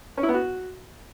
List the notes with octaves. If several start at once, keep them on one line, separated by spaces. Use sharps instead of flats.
C#4
E4
B3
F#4